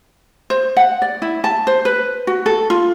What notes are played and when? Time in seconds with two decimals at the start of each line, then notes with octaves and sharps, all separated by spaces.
0.50 C5
0.77 F#5
1.02 D5
1.22 E4
1.44 A5
1.67 C5
1.85 B4
2.27 F#4
2.46 A4
2.70 F4